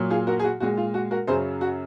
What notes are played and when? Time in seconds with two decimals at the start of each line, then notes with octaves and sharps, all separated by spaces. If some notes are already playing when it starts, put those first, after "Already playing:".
Already playing: A#2 F#3
0.10 F4 G#4
0.27 F#4 A#4
0.39 G#4
0.44 F#4
0.60 A#2 G#3 F#4
0.77 F4
0.94 F#4
1.11 F#4 A#4
1.27 F#2 C#3 F#3 G#4 C5
1.61 F#4